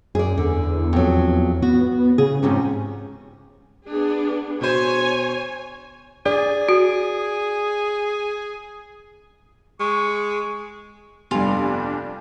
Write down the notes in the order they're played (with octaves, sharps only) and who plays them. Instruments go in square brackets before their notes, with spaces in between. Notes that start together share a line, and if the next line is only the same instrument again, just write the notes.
[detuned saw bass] F#2 [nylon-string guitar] G#4 D5
[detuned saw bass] E2 [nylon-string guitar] D3
[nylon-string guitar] F2 F#3
[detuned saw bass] B3 [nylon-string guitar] F#4
[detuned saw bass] C#3 [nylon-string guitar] G#4
[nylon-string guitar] F2 G#2 C3 [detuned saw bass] C#4
[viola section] B3 D4 G#4
[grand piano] B2 C5 [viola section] C#5 G#5
[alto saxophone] G#4 [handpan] D5
[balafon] F#4
[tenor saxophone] G#3 [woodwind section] C#6
[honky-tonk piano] F1 G2 [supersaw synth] G3 D4 [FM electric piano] B3 G4 G#5 [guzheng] F4